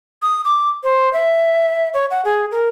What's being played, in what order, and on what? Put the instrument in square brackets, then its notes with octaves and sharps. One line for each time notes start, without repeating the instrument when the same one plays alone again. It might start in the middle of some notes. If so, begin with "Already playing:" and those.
[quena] D#6
D6
C5
E5
C#5
F#5
G#4
A#4